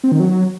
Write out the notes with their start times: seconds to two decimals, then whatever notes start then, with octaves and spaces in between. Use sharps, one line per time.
0.04 C4
0.12 D#3
0.20 F#3